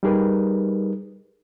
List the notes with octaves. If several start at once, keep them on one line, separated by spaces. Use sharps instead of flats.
G3 D#4 G4 G#4 A#4 B4